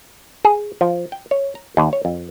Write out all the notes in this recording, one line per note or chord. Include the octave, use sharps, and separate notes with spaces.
G#4
F3
G5
C#5
A#5
D#2
C#5
F2